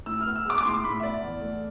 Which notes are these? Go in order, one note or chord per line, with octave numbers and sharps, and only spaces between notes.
A2 E6
F6
B3
E6
G#3 D6
D6
A2 C6
A2 B5
E5
B3 D5
E2
A3